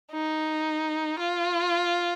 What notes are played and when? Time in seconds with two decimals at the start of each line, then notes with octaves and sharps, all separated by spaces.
0.12 D#4
1.19 F4